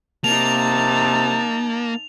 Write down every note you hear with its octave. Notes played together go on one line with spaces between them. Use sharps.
C3 A#3 D#4 A5 F7